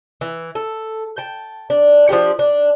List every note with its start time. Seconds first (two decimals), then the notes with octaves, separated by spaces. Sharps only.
0.21 E3
0.55 A4
1.18 G5 A5
1.70 D4
2.09 F3 D4 F#4 G4
2.39 D4